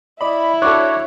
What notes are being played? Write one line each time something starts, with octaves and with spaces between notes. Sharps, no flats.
E4 D5 D#5 B5
D4 F#4 A4 C#5 C#6 D6 F#6